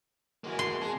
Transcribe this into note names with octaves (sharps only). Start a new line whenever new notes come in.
E3 G#3 A#3 F#4
C6
C3 G#3 A5